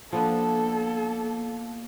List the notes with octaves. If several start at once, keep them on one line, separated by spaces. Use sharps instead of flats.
F3 A#3 B3 D4 A4